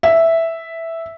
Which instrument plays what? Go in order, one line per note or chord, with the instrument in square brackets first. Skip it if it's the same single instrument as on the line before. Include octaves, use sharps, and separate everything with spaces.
[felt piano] E5